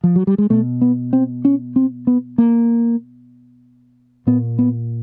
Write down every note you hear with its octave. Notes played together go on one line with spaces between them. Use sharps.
F3
F#3
G3
G#3
B2 A3
B3
C4
C#4
C4
B3
A#3
A#2 B3
B3